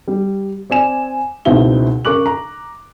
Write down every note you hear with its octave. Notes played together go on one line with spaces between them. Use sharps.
G3
C4 D5 G#5 E7
C#2 B2 C4 D#4 E4 G7
C#3 A#4 C#6 D6 F#6 F#7
A#5